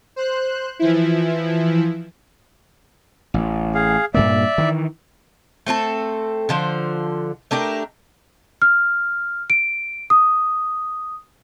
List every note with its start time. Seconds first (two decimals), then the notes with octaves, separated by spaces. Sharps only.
0.16 C5 F#6
0.79 E3 F3 E4
3.34 A1
3.75 G#4 F5
4.14 G2 A#2 A#3 D5 E5
4.58 D#3 E3
5.66 A3 C4 F4 A4
6.49 D3 F3 C5
7.51 A3 D4 G4 A#4
8.62 F6
9.50 D7
10.10 D#6